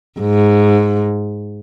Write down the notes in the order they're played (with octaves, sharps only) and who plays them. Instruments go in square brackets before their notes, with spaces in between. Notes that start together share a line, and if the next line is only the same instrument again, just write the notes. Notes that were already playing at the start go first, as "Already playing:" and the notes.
[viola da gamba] G#2